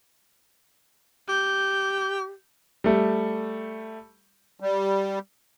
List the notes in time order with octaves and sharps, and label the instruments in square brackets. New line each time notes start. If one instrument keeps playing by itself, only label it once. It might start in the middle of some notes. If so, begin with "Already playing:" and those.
[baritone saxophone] G4 [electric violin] G6
[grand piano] G3 A3
[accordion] G3